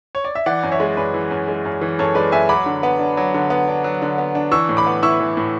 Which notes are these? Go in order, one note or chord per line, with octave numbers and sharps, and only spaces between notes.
C#5
D5
E5
E3 D5 F#5
F#2
C#5 E5
G#3
F#2 B4 D5
E3
F#2
G#3
F#2
E3
F#2 A4 C#5
G#3 B4 D5
F#2 E5 G#5
F#3 B5 D6
D3
B3
D4
F#3
D3
B3
D4
F#3
D3
B3
D4
E3 C#6 E6
A2
B5 D6
B3
E4 C#6 E6
E3
A2